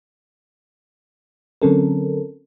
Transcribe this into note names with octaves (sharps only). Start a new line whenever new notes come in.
D3 F#3 C4 C#4 A4 A#4